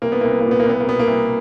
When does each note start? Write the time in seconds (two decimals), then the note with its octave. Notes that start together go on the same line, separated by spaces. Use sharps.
0.02 C2 A#3
0.12 B3
0.21 C2 A#3
0.31 B3
0.40 A#2 A#3
0.51 B3
0.60 A#3
0.65 C2 B3
0.80 A#3
0.86 B2 B3
0.99 A#3
1.07 C2